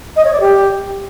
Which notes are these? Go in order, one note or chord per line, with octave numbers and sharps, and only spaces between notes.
D#5
C#5
D5
G4